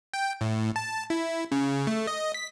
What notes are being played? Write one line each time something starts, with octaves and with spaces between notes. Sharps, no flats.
G5
A2
A5
E4
C#3
A3
D#5
B6